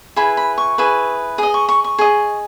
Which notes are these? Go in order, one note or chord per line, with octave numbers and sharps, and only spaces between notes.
E4 G#4 B4 B5
B5
C#6
E4 G#4 B4
G#4 D#5 D#6
C#6
C#6
C#6
G#4 D#5